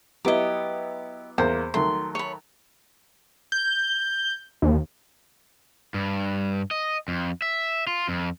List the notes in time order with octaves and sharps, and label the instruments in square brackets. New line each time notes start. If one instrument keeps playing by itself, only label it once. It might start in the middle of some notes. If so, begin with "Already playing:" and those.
[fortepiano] F#3 B3 E4 [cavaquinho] G4 D#5
[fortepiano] E2 A#3 [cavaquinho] C5
[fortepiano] D#3 F#3 A3 [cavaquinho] C6
[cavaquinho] C#5 B5
[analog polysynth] G6
D#2
[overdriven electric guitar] G2
D#5
F2
E5
F4
F2